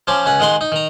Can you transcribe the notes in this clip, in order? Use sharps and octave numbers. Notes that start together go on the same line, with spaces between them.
F3 C#4 C5 D6
C#2 C#4 F#5
D#3 G#3 F#5 C6
D#4
D#3 A#5